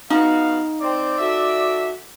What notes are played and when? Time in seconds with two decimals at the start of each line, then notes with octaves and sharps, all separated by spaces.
0.10 B3 D#4 F#4 F5
0.81 C4 D5
1.18 F#4 A4 E5